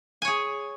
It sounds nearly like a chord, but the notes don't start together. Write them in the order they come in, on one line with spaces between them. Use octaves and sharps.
G#5 C#5 G#4